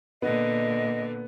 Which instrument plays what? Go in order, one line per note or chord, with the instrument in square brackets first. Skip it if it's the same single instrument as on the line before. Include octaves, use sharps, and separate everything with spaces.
[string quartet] A#2 D3 [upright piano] B3 [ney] D#5